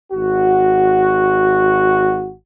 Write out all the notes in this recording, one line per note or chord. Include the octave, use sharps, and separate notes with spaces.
G#1 F#4